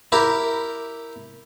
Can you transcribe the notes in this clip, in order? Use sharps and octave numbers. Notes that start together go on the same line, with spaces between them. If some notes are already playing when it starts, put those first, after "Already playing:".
E4 G4 A#4